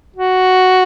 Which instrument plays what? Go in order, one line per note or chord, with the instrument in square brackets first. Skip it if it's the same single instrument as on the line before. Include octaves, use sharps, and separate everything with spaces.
[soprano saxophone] F#4